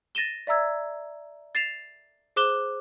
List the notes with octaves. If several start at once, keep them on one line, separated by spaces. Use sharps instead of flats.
A6 A#6 D#7 E7 G7
D5 E5 A#5 E6 G#6
A6 C7 E7 F7
G#4 C5 D6 F#6 E7 G7